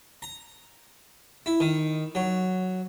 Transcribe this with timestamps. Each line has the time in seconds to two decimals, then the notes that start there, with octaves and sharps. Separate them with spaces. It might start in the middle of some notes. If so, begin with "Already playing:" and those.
0.22 A#5
1.46 E4
1.60 D#3
2.15 F#3